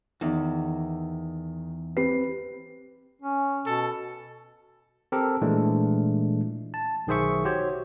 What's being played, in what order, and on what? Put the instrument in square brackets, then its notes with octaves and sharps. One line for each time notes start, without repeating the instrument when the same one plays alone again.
[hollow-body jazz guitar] E2 [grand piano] D#3
[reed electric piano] C4 G4 B4 [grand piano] C7
[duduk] C#4
[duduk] B2 [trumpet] A4
[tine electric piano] C4 G4 A4 A#4
A#2 E3 G#3 A3 D4
A5
B1 D#3 G#4 C5 E5 C#6
F#4 G4 C5 C#5